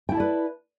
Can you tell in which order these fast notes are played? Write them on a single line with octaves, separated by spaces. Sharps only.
G5 E4 A5 D5 B4